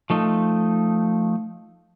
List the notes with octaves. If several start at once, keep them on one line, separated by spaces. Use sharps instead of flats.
F3 A3 D#4